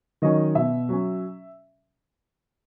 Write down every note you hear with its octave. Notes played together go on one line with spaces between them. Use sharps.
D#3 F#3 C#4 D#5
B2 E5
F#3 C#4